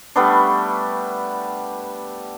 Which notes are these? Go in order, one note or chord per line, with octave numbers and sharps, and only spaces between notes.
G3 A3 B3 D4